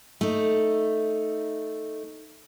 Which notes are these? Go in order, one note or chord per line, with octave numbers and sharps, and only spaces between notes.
A3 D#4